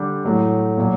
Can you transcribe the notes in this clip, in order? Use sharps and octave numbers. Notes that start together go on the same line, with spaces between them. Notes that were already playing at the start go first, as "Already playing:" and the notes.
Already playing: D3 G3 D4 G4
A2 F#3 A3
A#2 F#3